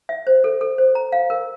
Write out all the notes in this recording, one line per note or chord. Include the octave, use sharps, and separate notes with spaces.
E5
C5
A4
A4
C5
A#5
F5
A#4